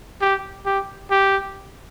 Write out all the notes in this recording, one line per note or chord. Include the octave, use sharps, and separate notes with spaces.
G4
G4
G4